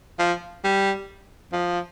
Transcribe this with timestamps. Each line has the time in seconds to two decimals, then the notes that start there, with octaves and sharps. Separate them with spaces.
0.19 F3
0.64 G3
1.53 F3